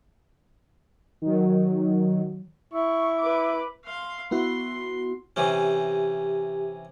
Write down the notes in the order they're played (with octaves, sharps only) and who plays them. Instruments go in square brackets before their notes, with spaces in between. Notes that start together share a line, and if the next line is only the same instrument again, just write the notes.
[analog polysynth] D#3 F#3
[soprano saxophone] E4 [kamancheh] C#6
[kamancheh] B4 D6
[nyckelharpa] F5 C6
[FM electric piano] B3 E4 F#4 [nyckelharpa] C6
[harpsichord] C3 E3 C#4 [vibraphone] G4